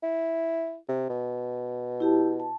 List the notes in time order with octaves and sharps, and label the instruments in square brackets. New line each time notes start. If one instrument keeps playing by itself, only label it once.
[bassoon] E4
C3
B2
[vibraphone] E4 G4 A5
A5